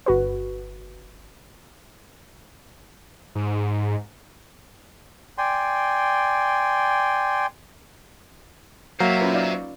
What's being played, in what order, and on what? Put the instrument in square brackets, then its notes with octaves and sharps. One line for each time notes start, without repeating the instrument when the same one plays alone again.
[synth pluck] G1 F#4 B4
[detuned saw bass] G#2
[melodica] D5 G5 G#5 C6
[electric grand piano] F#3 [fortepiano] A#3 [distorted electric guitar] C5 E5
[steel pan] C#4 F4 B4
D#4 D5 F5